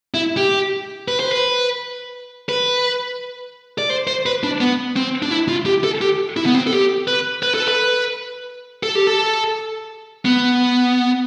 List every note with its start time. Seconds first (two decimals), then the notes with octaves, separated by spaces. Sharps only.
0.14 E4
0.37 G4
1.08 B4
1.20 C5
1.32 B4
2.49 B4
3.78 D5
3.90 C5
4.07 C5
4.26 B4
4.43 D4
4.61 B3
4.96 C4
5.22 D4
5.31 E4
5.49 F4
5.66 G4
5.84 A4
6.01 G4
6.37 E4
6.46 B3
6.55 C4
6.67 A4
6.72 G4
7.08 B4
7.43 B4
7.54 A4
7.68 B4
8.83 A4
8.95 G4
9.07 A4
10.25 B3